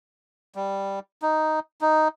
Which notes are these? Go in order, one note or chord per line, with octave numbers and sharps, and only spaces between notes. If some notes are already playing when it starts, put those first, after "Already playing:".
G3
D#4
D#4